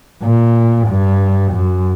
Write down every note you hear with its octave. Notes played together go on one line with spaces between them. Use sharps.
A#2
G2
F#2